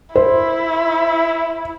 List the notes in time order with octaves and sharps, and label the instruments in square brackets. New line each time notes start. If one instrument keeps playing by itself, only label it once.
[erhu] E4 [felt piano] C5